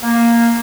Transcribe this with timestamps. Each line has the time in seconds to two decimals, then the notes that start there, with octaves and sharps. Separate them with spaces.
0.03 A#3